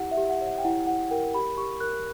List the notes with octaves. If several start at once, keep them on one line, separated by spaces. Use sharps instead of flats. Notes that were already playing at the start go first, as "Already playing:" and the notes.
Already playing: E4 G4 F#5
E5
G4
F#5
C#5
F#5
G5
E4 F#5
E4 F#5
A#4 G5
G4 B5
G4 C#6
A#4 F#6